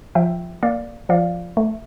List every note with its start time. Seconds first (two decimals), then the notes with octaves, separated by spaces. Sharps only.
0.15 F3 E5 G5
0.63 A#3 D5 F5
1.09 F3 D5 F5
1.57 A3